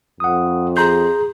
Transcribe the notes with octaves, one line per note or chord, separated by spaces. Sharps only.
F2 F#5 D#6
G#4 A#5 C6 G6